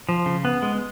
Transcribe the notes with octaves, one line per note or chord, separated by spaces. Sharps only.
F3
C#3
B3
G#3